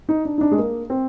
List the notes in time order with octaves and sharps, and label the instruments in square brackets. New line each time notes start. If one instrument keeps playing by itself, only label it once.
[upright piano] D#4
D4
D#4
D4
G#3
A#3
C4